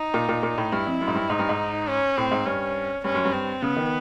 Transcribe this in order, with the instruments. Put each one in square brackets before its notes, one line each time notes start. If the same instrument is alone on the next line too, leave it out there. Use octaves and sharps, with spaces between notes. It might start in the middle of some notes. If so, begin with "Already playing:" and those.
Already playing: [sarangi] D#4
[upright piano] A#2
A#2
A#2
A2
[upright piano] G2 [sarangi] E4
[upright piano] F2
F#2
G#2
G2
[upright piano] G#2 [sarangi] D#4
[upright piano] G2
G#2
[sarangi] C#4
[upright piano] A2 [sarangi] C4
[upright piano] G#2
[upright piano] G2 [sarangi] C#4
[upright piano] G2 [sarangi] C#4
[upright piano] F#2
G2
[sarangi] C4
[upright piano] C#3 [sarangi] B3
[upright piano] D#3